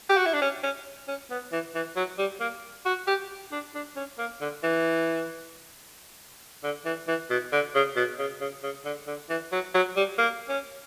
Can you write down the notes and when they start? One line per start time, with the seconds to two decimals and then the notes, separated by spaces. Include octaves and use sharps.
0.10 G4
0.17 F#4
0.26 E4
0.34 D4
0.41 C#4
0.63 C#4
1.08 C#4
1.30 B3
1.52 E3
1.75 E3
1.96 F#3
2.19 G3
2.40 A#3
2.86 F#4
3.07 G4
3.52 D4
3.75 D4
3.96 C#4
4.18 A#3
4.41 D3
4.63 E3
6.63 D3
6.85 E3
7.08 E3
7.30 B2
7.52 D3
7.75 C#3
7.96 B2
8.19 C#3
8.41 C#3
8.63 C#3
8.85 D3
9.07 D3
9.30 E3
9.52 F#3
9.74 F#3
9.96 G3
10.18 A#3
10.49 C#4